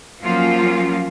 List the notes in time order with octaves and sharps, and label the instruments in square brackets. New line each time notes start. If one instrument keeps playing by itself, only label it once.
[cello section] F3 F#3 A#3 C#4 F4